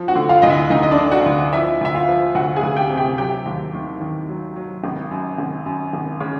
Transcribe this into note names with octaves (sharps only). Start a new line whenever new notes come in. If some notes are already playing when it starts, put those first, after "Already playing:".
Already playing: F3
F#4 F#5
D3
F4 F5
D2 D#5
E4 E5
D2 D#4 D#5
D#5
D4 D5
D3
F#4 F#5
D2
F3 E4 E5
D2 E5
F4 F5
F3
D2 F#4 F#5
G#4 G#5
D2
G4 G5
C3
G4 G5
F#3 G4 G5
D#2
D#3
D#3
F#3
F#3
G#1
F#2
G#1
F#2
G#1
C#3